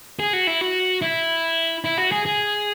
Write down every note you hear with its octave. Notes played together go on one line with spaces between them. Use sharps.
G#4
F#4
E4
F#4
E4
E4
F#4
G#4
G#4